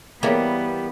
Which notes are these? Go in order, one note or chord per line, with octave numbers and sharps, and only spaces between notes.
E3 G3 A#3 B3 G#4 A#4 C#5